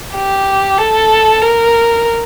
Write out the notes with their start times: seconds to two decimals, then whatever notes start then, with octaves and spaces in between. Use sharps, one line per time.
0.14 G4
0.78 A4
1.41 A#4